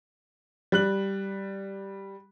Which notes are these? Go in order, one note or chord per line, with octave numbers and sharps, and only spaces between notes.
G3 F#6 F#7